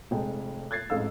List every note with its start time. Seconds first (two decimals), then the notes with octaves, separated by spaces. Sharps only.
0.11 F1 F2 G#3 G5
0.71 F#6 G#6 A6 C7
0.90 A1 F2 G#2 F5 E6